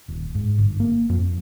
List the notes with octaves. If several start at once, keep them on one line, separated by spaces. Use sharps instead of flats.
D#1
G#2
G1
A#3
F2